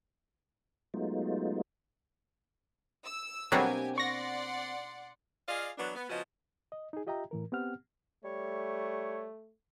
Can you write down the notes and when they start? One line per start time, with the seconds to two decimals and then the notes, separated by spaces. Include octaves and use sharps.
0.94 F#3 G#3 A3 B3 D#4 F4
3.05 E6
3.52 B2 F#3 G3 A#3 C4 D4 G4 G#5
3.98 D5 F#5 C6 C#6 A#6
5.48 F4 G#4 D5 D#5 F5
5.78 E3 F#3 B3 D4
5.95 B3
6.09 C#3 F3 B3 C#4 F#4 D#5
6.72 D#5
6.93 D#4 G#4
7.07 F4 G4 D#5 E5 G5 A#5
7.31 A2 E3 A#4
7.52 B3 C4 G4 F#5 F6
8.25 G3 A3 C#5